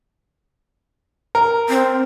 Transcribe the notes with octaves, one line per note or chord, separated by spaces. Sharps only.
A#4
C4